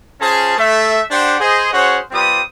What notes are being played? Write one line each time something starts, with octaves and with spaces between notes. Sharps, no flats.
C#4 F4 G#4 C5 A5
A3 E5
D4 G4 C5 F#5
G#4 C5 D#5
C#4 F#4 G#4 C5 C#5 F#5
G3 C4 F4 G4 B4 D#6